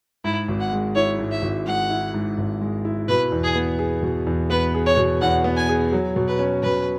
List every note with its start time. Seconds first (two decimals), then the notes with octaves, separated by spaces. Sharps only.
0.24 G#2 E4
0.48 G#1
0.60 F#5
0.72 G#3
0.95 E4 C#5
1.19 G#2
1.31 E5
1.42 G#1
1.66 G#3 F#5
1.90 E4
2.14 G#2
2.38 G#1
2.61 G#3
2.85 E4
3.08 B2 B4
3.32 E2
3.44 G#4
3.56 B3
3.79 G#4
4.03 B2
4.27 E2
4.50 B3 B4
4.75 G#4
4.86 C#5
4.97 B2
5.22 E2 F#5
5.44 B3
5.57 G#5
5.69 G#4
5.93 F#3
6.16 B2
6.28 B4
6.39 C#4
6.63 B2 B4